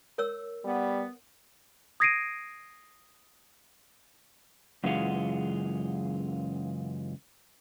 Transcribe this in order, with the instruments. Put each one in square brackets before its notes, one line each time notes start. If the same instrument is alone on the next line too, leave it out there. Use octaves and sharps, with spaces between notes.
[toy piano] A#4 C#5 E6
[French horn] G3 [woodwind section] B3
[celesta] D#6 G#6 A#6 C7 D7 D#7
[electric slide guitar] F#2 C#3 E3 G#3 F4 F#5